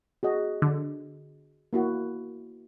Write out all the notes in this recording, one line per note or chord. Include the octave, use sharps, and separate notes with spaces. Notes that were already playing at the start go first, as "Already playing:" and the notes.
F#4 G#4 D#5
D3
A#3 E4 F#4